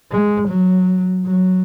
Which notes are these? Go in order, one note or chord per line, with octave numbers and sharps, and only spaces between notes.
G#3
F#3
F#3